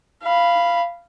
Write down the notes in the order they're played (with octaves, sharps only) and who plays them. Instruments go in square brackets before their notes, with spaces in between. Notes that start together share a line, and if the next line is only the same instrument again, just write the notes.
[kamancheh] F5 B5